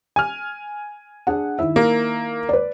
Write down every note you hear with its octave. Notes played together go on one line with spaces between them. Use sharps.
G#5 F6
D4 G#4 F#5
D#3 E4 E5
A#3
B4 D5